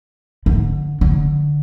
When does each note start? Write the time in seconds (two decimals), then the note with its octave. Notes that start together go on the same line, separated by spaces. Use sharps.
0.46 D3
1.01 D3